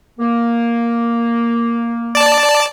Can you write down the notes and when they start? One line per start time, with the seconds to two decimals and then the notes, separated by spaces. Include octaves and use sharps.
0.19 A#3
2.15 D5 A5